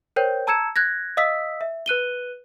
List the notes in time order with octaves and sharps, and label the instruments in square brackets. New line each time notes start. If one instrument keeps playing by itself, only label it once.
[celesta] A#4 C5 C#5 G5 G6
A5 A#5 E6 G#6 C#7 E7
F#6 G#6 A#6
D#5 F5 D#6 E6 B6
E5
B4 F#6 D#7 G7